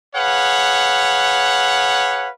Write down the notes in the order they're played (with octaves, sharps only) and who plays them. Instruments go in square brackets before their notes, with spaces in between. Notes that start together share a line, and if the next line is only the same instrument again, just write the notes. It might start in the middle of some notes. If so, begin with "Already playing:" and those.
[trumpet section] G#4 B4 C#5 F5 F#5